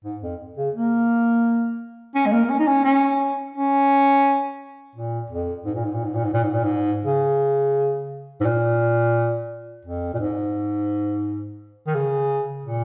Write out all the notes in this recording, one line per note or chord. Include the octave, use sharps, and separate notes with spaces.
G#2
F2
C#3
A#3
C#4
G#3
A#3
A#3
C#4
D#4
C#4
C#4
C#4
A#2
F2
G#2
A#2
G#2
A#2
G#2
A#2
G#2
A#2
G#2
A#2
G#2
C#3
G#2
A#2
F2
A#2
G#2
D#3
C#3
A#2